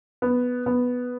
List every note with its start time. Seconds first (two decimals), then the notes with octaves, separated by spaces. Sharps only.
0.22 B3
0.66 B3